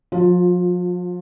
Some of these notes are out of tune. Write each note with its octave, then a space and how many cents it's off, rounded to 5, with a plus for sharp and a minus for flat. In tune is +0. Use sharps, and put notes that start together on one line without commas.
F3 +40 F4 +15